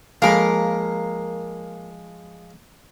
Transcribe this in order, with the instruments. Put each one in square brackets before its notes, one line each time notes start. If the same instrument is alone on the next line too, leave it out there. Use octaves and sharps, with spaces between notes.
[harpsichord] F3 G#3 B5 [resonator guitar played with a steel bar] A#3 A#4